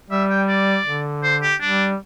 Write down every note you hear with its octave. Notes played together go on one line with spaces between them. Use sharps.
G3 E5
G5
D5
D3
C5
G4
G3 D4